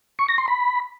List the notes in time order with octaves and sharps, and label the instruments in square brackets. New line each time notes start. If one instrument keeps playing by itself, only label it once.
[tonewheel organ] C#6
A#6
C6
B5